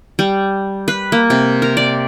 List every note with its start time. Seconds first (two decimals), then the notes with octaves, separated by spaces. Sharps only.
0.19 G3
0.88 B4
1.12 A#3
1.30 C3
1.62 A#4
1.77 D5